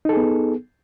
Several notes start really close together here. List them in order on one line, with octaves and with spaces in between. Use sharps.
D#4 A4 G#4 B3